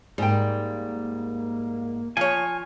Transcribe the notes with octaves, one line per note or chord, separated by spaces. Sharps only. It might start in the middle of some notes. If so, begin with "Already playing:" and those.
G#2 G3 A#3 G5
F3 C#5 G#5